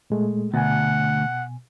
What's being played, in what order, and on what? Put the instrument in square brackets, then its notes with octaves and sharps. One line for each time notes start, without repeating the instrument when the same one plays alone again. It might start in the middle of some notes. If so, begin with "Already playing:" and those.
[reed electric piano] A#2 G#3 A3
[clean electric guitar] D2 [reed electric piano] B2 G#5 [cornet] F#5